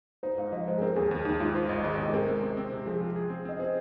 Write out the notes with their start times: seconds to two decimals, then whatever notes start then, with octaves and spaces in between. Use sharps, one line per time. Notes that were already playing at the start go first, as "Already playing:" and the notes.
0.23 D#4 C5
0.38 G#2 F5
0.52 F3 D#5
0.68 G#3 C5
0.78 G#4
0.82 C4 A#4
0.96 D#2 G#4
1.11 D#2 G#4
1.25 D#2 D#4
1.40 G#2 F4
1.55 F4 C5
1.69 G#1 D#5
1.84 G#3 D#5
1.99 C3 D#5
2.06 G#4
2.14 C4 A#4
2.28 G#3
2.43 C4
2.57 C4
2.72 C3
2.86 F3 G#4
3.01 F4
3.16 G#4
3.30 C4
3.45 C4 D#5
3.59 G#4 C5